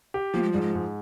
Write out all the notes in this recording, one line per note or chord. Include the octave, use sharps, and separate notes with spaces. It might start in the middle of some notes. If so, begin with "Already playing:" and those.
G4
F3 A#3
G#3
G#2 G3
G#3
G#2